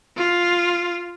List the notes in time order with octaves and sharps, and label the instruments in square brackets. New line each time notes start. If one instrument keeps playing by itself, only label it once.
[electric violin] F4